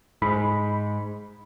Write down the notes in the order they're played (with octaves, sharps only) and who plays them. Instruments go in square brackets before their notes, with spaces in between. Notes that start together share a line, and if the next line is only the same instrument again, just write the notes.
[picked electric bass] G#2 [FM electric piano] B5